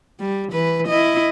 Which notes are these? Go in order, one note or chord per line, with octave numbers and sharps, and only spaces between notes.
G3
E3 B4
E4 D#5